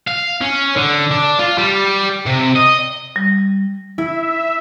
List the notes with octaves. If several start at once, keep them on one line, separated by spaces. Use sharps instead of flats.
F5
C#4
D3
D4
F4
G3
C3
D#5
G3
E4 E5